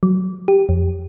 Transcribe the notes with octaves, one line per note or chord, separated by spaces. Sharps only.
F#3
G4
F2